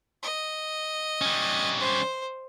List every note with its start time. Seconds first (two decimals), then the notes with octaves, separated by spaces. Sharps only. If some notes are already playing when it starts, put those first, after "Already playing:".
0.23 D#5
1.21 G3 C#4
1.80 C5